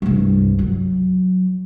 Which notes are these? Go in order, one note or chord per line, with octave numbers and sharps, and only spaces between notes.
C2 G2
F#3